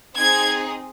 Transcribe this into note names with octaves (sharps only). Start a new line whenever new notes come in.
C4 D#4 G#4 G#6